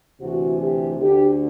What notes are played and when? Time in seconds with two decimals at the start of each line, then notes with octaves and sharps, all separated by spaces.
0.21 D2 C3 E3 F#4
0.60 G4
1.01 D2 D3 G4